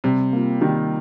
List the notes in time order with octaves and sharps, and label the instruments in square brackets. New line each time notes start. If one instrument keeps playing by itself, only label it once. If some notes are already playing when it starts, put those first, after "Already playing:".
[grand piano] C3 [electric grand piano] G3
[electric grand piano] A#3 F4
[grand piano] D#3 [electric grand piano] G3